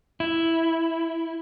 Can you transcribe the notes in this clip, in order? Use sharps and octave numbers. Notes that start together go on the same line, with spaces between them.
E4